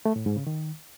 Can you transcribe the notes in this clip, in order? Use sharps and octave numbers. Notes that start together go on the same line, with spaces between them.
A3
A2
G#2
C#3
D#3